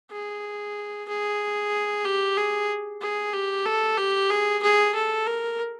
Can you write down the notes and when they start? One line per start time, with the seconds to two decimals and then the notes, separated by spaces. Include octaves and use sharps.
0.12 G#4
1.09 G#4
2.05 G4
2.37 G#4
3.01 G#4
3.34 G4
3.66 A4
3.98 G4
4.30 G#4
4.63 G#4
4.95 A4
5.27 A#4